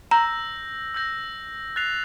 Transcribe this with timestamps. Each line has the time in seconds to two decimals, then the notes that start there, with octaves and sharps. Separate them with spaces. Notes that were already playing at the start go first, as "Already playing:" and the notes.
0.11 A#5 E6 G6 A#6
0.94 E6 G6 A#6
1.76 F#6 A6 C7 F7